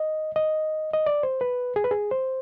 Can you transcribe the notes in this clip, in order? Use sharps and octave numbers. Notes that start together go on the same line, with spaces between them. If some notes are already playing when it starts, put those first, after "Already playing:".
Already playing: D#5
D#5
D#5
D5
C5
B4
G#4
B4
G#4
C5